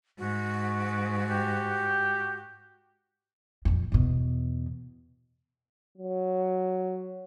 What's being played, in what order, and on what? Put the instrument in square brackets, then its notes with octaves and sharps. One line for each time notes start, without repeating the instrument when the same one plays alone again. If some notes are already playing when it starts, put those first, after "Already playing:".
[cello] G#2 [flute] F#4
[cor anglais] G4
[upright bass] F2 A#2
E2 B2
[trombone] F#3